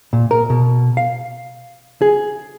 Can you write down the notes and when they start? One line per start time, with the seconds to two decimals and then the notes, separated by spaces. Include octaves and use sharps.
0.13 A#2
0.31 A#4
0.50 B2
0.97 F5
2.02 G#4